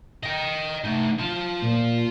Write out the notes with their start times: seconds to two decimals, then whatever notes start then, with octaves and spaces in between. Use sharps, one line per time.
0.23 D#5 G5
0.84 A3 D#4
1.19 F4 A5
1.62 A#2